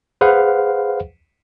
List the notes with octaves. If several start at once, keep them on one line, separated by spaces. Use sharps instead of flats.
G#4 B4 C5 F5 F#5